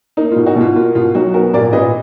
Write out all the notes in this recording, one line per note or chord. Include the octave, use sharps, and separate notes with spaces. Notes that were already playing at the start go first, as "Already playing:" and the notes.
A#3 D#4
F4
B2
D#4 F#4
B2 F4
A#3 F4
B2 F4
F#3 D#4 F#4
B3 F#4 A#4
A#2 A#4 D5
A#2 B4 D#5